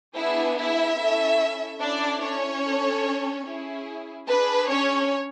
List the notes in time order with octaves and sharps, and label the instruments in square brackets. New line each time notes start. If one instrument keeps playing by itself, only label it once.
[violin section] B3 D4 E4 G#4 E5
E4 E5
C#4 E4 A4
C#4 D4 E4 A4 D5
C#4 C#5
D4 A4
C#4 E4 G#4
D4 G#4 B4
C#4 C#5